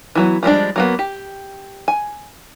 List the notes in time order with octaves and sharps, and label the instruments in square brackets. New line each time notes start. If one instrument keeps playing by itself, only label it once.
[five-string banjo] E3 F#3 B3
F3 G3 G#3 D4
F#3 A#3 B3
G4
G#5